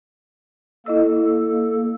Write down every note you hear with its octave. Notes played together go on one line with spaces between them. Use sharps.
A#3 E4 A4 D#5 E6